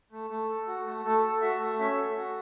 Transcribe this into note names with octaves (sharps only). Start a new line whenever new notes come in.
A3
A3
A4
F#4
A3
A3 A4
A4
F#4 E5
A3
C#4 E5
A4
F#4